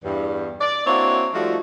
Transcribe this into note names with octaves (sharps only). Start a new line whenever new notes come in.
E2 G2
D5
A#3 C4 D4 E4 F#4 C#5
F3 G3 A3 D#4 F4 F#4